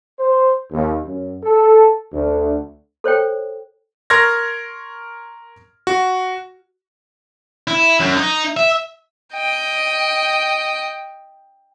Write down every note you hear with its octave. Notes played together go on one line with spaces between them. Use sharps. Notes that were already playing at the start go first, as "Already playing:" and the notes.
C5
D#2
F#2
A4
D2
A4 C5 C#5 G5
A#4 C6 C#6 F6 G#6 A#6
F#4
E4
F#2
D#4
E5
D#5 G5